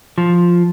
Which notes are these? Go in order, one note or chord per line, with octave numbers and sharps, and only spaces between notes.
F3